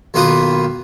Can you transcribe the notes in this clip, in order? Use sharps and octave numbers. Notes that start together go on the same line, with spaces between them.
B1 D#3 A#3 F4 B4 D#6